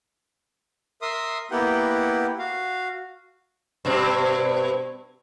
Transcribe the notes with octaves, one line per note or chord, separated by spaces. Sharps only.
A#4 E5 C6 D#6
A#3 B3 E4 G4 F#5 G5
F#4 F5
G2 B2 C4